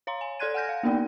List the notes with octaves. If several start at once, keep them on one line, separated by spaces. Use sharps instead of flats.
C#5 F5 A#5 C6
G#5
A4 D5 C6 F#6 G#6 D#7
F#5 G#5 F6 G6 A#6
F5
A#3 B3 D#4 A#4 D5 G5